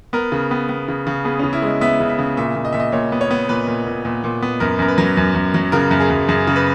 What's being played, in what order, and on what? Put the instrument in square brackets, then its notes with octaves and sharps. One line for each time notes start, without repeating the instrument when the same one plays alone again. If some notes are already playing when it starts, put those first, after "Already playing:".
[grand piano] B3 A#4
C#3
B3
B3
C#3
C#3
B3 G#4
C#3 C#4
E4
G#3 D#5
B3 E5
C#3
E5
C#3
A#2 E5
A#2
D#5
A#2 E5
D#5
A#2 C#5
B3
C#5
B3
A#2 B4
A#2
A#2
A#2
A#2
B3
F#2 A#4
F#2 A#4
B4
F#3
F#2
F#2
F#3
C#3 A#4
F#2
G#4
F#2
F#2 G#4
C#3
B4